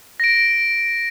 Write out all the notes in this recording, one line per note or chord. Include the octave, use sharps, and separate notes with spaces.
A#6 D7